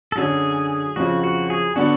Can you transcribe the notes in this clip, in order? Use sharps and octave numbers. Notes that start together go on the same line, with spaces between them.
A4
F#2 D3 F#3 C#4 G#4
F2 C#3 F#3 C#4 F4 F#4
F#4
G#4
D3 F#3 B3 D4 F#4